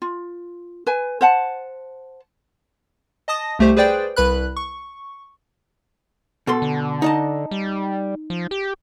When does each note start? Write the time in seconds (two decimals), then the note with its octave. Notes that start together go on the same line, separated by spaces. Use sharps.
0.02 F4
0.87 B4 G#5
1.21 C5 F#5 A5
3.28 D#5 A5 D#6 A#6
3.59 C2 A3 G4 C5
3.77 G#4 B4 C5 D5 G5
4.16 C2 B4 B5 F#6
4.56 C#6
6.47 B2 A4 C6
6.62 D3
7.02 D#4 D#5 A5
7.51 G3
8.30 F3
8.51 G4